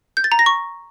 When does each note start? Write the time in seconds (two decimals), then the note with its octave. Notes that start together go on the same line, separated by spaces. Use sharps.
0.17 G6
0.24 A6
0.32 A#5
0.39 A#6
0.46 C#6